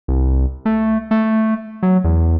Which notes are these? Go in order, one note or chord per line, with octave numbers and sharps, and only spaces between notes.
C2
A3
A3
F#3
E2